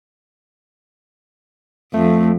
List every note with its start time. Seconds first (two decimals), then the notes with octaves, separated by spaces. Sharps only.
1.94 F2 A3